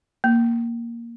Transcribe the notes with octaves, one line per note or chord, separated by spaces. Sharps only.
A#3